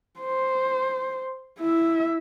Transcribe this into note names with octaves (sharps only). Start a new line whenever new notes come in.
C5
E4 E5